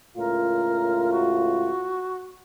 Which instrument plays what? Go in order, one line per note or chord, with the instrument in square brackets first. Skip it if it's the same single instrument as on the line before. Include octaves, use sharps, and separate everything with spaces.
[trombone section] C#2 A2 F4 [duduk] A#4
[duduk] F#4